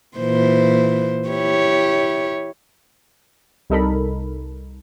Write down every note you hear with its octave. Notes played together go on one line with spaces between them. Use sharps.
A#2 E3 C5
E4 G4 C#5
C2 G3 D#4 A4 A#4 B5